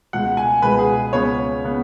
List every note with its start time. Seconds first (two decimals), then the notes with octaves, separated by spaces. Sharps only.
0.13 C#2 B2 G#3 F#5
0.37 G#5
0.62 C#2 B2 G#3 B4
0.79 G#4
1.13 C#2 C#3 B3 C#5
1.64 C#3 B3